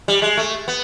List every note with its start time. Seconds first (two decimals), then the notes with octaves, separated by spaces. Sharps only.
0.08 G3
0.22 G#3
0.37 A3
0.68 B3